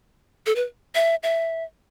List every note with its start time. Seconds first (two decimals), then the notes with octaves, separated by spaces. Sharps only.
0.46 A4
0.56 B4
0.95 E5
1.23 E5